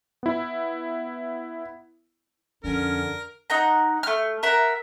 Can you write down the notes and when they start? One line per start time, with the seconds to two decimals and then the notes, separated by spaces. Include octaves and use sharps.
0.23 B3 E4
2.64 F2 D3 C#4 A#4
3.50 D#4 F#5 A#5
4.03 A3 F6
4.43 A#4 E5 F#5